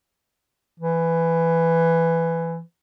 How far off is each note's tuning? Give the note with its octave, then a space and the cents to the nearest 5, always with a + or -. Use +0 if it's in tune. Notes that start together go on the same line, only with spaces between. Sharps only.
E3 +10